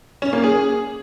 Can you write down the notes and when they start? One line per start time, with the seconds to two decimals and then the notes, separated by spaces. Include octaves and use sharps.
0.22 C#4
0.33 A#3
0.44 G#4